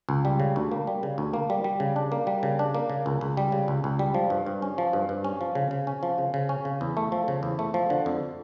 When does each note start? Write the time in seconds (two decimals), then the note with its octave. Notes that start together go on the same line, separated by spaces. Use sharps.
0.09 C#2
0.25 G3
0.40 C#3
0.56 D2
0.72 A#3
0.87 G3
1.03 C#3
1.18 D2
1.33 A#3
1.50 G3
1.64 G3
1.80 C#3
1.96 D4
2.12 A#3
2.27 G3
2.43 C#3
2.59 D4
2.75 A#3
2.90 C#3
3.06 C#2
3.21 C#2
3.37 G3
3.52 C#3
3.68 C#2
3.84 C#2
3.99 G3
4.14 F3
4.30 G2
4.46 G2
4.62 C#4
4.78 F3
4.93 G2
5.09 G2
5.24 C#4
5.41 F3
5.55 C#3
5.71 C#3
5.87 C#4
6.03 F3
6.18 C#3
6.34 C#3
6.49 C#4
6.65 C#3
6.81 E2
6.97 A3
7.12 F3
7.28 C#3
7.43 E2
7.59 A3
7.74 F3
7.90 D3
8.06 F2